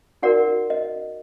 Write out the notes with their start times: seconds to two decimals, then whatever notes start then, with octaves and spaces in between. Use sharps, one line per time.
0.22 D#4 F#4 A#4 D5 F#5
0.70 D#5